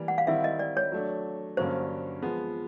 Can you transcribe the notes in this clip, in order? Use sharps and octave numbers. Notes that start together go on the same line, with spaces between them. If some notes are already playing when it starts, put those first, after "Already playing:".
Already playing: E3 G3 A#3
F#5
F5
D#3 G3 C4 E4 E5
D#5
D5
C#5
F#3 A3 D4
G2 D3 F#3 A#3 C#4 C5
F3 G#3 B3